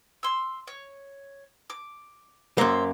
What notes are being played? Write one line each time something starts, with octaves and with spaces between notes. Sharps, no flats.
C6 E6
C#5
D6
F#2 A#3 C5 E5 C6